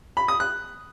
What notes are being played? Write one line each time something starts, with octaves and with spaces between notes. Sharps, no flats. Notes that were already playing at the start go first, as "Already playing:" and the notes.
B5
D#6
F#6